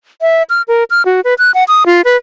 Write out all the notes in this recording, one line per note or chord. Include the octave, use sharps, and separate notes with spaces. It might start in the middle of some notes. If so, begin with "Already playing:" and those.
E5
F6
A#4
F6
F#4
B4
F#6
F#5
D#6
F4
B4